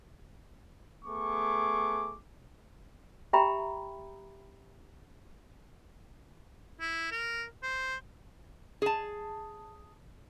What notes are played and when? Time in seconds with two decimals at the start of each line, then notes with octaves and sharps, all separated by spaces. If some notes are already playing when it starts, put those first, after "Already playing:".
1.05 A3 B3 G#4 C#6 D6
3.33 G4 E5 G5 A#5 B5
6.81 E4
7.11 A#4
7.63 C5
8.82 G#4 A5